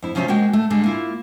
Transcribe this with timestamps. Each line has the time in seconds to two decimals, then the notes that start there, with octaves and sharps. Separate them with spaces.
0.02 F2 E4
0.15 C3 F3 F#3 C#4 D#4 F4
0.28 G#3 A#3 F#4 G5
0.53 A3
0.70 D3 G3 G#3 A4
0.84 A#3 E4 F4